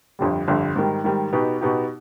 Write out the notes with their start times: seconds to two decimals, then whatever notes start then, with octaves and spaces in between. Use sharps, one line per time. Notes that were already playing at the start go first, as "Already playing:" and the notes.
0.19 G1 F2 D3 G3
0.48 G1 F2 D3 G3
0.76 G#2 D#3 G3
1.04 G#2 D#3 G3
1.33 B2 B3 D#4 G4
1.61 B2 B3 D#4 G4